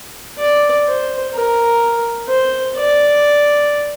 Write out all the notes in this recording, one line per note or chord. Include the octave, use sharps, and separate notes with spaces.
D5
C5
A#4
C5
D5